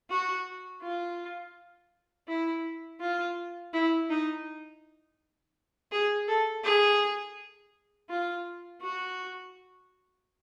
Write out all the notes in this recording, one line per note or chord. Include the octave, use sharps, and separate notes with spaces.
F#4
F4
E4
F4
E4
D#4
G#4
A4
G#4
F4
F#4